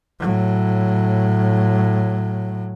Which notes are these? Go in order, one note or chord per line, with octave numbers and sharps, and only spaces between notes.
A2 F#3